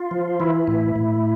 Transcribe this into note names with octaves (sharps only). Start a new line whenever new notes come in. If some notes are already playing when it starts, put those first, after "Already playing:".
Already playing: F4
F3
E3 E4
A2
A2